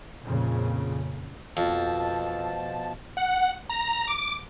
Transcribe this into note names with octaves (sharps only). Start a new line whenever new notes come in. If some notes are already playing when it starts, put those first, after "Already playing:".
F2 A#2 C#3
F2 B2 F3 A5
F#5
A#5
D6